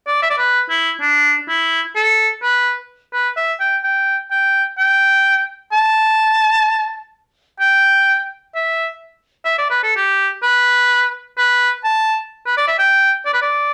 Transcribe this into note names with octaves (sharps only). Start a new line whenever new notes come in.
D5
E5
D5
B4
E4
D4
E4
A4
B4
B4
E5
G5
G5
G5
G5
A5
G5
E5
E5
D5
B4
A4
G4
B4
B4
A5
B4
D5
E5
G5
D5
B4
D5